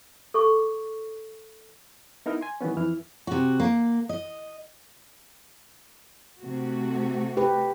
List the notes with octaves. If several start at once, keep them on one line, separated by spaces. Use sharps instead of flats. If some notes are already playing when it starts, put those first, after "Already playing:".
A4 C#6 D6
B3 D#4 E4 A#4
G#5 C6
D#3 E3 G3 B3 C#4
F2 E3 E4 F6
C3 F#4
A#3
D#5
C3 A3 F#4
G4 B4